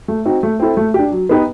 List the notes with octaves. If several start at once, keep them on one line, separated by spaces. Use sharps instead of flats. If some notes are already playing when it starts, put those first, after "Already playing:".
A3
C4 D#4 F#4
A3
C4 E4 A4
A3
D4 G4
F#3
B3 D#4 G4 B4